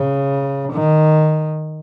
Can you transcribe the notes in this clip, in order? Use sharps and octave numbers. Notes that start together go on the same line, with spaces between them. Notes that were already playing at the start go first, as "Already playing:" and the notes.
Already playing: C#3
D#3